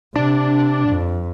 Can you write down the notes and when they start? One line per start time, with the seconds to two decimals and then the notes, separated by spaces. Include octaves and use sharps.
0.16 C3 D4
0.89 F2